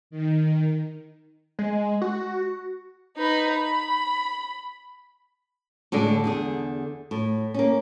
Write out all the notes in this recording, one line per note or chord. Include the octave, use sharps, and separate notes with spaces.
D#3
G#3
F#4
D#4 B4
B5
A2 D3 G#3 D4
E2 D3 G#4
A2
A#3 C#4